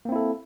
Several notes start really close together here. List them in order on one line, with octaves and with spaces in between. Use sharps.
A#3 C4 E4 A4